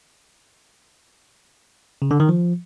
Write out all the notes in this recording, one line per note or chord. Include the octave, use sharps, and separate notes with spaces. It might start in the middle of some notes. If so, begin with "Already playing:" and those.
C#3
D3
D#3
F3